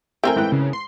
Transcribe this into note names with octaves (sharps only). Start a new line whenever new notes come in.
A3 C4 E4 A#4 G5 G#5
G#2 E3 F#6
C#3
C6